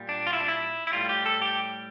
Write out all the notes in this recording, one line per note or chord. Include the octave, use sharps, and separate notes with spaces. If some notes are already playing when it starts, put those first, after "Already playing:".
Already playing: A#2 G3
D4
F4
E4
D4
E4
E4
A2 G3 F4
G4
A4
G4